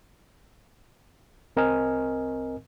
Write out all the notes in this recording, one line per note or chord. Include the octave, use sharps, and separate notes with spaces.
C2 C4 A#4 D#5 G#5 F6